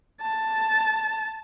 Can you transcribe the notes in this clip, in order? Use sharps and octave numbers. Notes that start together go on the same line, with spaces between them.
A5